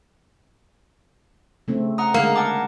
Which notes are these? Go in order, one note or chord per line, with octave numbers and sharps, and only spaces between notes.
C#3 A3 C4
F#5 A#5 D#6
D3 G#3 A#3 A#4
F#5 A5 D6